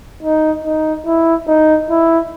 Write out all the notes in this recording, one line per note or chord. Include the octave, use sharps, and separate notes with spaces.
D#4
D#4
E4
D#4
E4